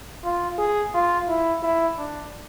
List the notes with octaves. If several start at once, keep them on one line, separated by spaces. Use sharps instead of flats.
F4
G#4
F4
E4
E4
D4